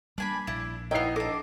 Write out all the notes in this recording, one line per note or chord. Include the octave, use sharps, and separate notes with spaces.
G3 A#3 D4 G#5 B5
A#1 D4 E4
B3 D#4 E4 C#5 F5 G5 C7
D4 A4 D#5 D6